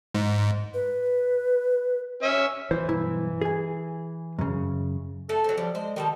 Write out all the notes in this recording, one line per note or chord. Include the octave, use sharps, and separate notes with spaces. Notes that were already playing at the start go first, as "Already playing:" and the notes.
G#2
B4
C#4 E5
E3 C5
B1 G2 E4
G#4 G#5
F#2 C#3
A3 A4
F#3 C4
F3 G3
G#3 C5
D3 D#3 G3 A5